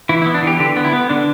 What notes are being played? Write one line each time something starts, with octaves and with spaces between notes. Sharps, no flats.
E3 E4
E4
B3
D4
E3 G4
D3 G4
B3
E4
B3
D3 D4